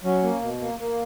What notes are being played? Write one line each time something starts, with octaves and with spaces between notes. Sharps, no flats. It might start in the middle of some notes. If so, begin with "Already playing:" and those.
F#3 C#4
A#3
B2
A#3
A#3